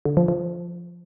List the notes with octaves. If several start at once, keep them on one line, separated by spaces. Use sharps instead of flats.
D3
F3
F3